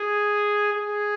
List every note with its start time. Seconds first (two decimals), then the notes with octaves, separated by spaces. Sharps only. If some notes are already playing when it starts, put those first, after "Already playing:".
Already playing: G#4
0.73 G#4